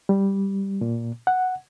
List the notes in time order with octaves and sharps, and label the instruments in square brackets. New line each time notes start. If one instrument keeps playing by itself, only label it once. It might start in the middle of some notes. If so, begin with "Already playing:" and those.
[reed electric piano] G3
A#2
F#5